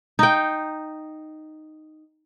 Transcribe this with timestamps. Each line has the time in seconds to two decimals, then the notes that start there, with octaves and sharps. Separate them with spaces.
0.19 D#4 G5